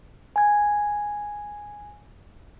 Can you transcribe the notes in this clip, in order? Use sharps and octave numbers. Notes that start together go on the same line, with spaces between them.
G#5 G#6